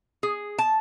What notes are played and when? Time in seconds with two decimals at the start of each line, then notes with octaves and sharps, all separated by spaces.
0.23 G#4
0.59 A5